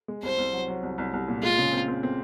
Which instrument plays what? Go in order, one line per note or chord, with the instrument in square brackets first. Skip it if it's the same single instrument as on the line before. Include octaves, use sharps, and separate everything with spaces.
[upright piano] G#3
[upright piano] C2 [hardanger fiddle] C5
[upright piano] C2
F#3
F#3
C2
C2
C2
A#2
[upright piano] G#3 [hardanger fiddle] F4
[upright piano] C#3
C4
C4
C4